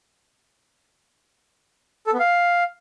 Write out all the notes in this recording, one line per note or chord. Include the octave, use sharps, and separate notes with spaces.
A4
B3
F5